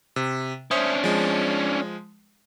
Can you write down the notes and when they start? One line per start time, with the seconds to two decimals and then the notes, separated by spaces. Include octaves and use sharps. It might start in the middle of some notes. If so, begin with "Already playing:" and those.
0.16 C3
0.71 C#4 D4 C5 E5 D#6
1.04 F3 G#3